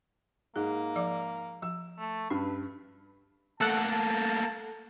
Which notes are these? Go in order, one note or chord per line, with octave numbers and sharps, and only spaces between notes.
G#2 A#3 G#4
F3 D5 D6
F3 E6
A3
G2 C#4 B4
A3 A#3 A4 F#5 A5